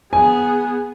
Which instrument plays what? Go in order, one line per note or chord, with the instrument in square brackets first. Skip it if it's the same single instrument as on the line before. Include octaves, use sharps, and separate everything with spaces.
[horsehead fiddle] B3 G#4 [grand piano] G#5